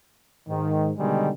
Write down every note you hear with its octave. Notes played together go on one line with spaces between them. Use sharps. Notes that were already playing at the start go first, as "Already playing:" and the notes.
G#2 D#3
B2 D3 D#3 G3 G#3